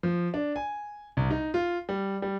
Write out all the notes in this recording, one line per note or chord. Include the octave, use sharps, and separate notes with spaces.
F3
D4
G#5
C2
D#4
F4
G3
G3